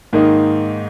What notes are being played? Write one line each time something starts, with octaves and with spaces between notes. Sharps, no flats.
G#2 D#3 A#3 D#4